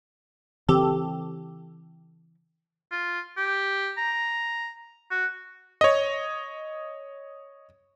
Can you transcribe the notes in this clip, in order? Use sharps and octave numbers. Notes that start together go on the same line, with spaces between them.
C#3 E3 C4 G4 A4
F4
G4
A#5
F#4
C#5 D#5